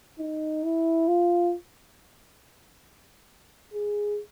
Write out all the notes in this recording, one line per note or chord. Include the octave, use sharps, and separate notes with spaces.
D#4
E4
F4
G#4